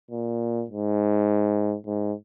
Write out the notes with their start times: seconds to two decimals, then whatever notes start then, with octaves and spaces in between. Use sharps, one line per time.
0.11 A#2
0.70 G#2
1.86 G#2